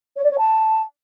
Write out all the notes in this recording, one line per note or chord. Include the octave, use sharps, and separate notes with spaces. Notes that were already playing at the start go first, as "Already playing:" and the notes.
C#5
D5
C#5
A5